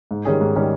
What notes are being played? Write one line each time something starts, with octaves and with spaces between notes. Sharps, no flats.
G#2
D#3 G3 C#4 G#4
G#2
D#3 G3 C#4 G#4